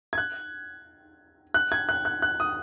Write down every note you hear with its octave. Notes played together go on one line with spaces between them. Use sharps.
G#6
F#6
F#6
G#6
F#6
F#6
F#6
D#6